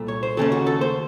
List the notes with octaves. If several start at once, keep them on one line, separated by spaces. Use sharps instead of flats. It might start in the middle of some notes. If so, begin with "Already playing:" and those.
Already playing: C2 A#2 A3
C#5
C5
D#2 C#3 A3 C#4 A4
F#4
A4
C5